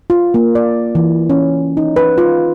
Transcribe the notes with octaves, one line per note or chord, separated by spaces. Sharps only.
F4
A#3
D5
E3
C#4
D#4
B4
F4